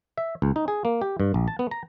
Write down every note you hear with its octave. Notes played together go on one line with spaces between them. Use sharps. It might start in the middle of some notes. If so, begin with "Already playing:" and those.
E5
C#2
D#4
G#4
A#3
G4
G2
A#1
A5
B3
A#5